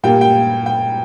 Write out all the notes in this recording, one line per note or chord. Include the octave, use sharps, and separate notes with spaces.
A#2 G3 A#3 G5
G5
G5